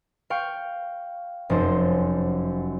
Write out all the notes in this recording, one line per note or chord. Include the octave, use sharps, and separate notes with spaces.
F5 G5 C#6
F1 F#2 C5